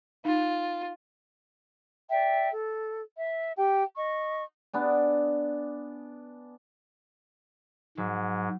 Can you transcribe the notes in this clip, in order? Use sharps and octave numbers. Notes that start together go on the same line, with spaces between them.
D#4 F4
D5 E5 G5
A4
E5
G4 G5
D#5 C#6
B3 D4 G#5
G#2 F#3